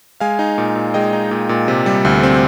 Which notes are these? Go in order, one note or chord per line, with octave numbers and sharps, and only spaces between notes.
G#3 F5 G#5
D#4
A#2
A#2
G#3 D#5 G5
D#4
A#2
A#2
C3
G3
D2
C4